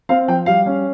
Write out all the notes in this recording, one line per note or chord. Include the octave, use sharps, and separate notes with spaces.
C4 F5
F3 G5
G3 F5
C#4